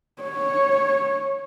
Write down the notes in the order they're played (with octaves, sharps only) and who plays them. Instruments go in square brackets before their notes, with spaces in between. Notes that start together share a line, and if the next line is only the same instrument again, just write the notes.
[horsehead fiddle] C#5